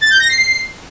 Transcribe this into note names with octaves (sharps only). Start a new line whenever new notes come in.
A6
G6
A#6
C7